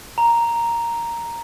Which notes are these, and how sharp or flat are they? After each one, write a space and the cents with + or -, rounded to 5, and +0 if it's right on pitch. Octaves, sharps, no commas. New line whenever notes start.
A#5 +0